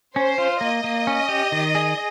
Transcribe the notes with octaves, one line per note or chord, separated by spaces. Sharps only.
C#4 C5
F4
A#3 D#5
A#3
C#4
G4
D#3
G#4